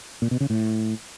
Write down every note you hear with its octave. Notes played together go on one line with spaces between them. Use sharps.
A#2
B2
C#3
A2